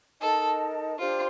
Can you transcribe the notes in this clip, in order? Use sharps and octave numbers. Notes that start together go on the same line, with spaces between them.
D#4 A4 A#4 D#5 A5
D4 F4 G4 C5